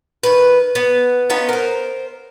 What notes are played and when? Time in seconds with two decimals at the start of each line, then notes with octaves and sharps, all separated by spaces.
0.23 D#3 B4
0.75 B3
1.30 B3 C#4 D#4 F4
1.49 A#4 C5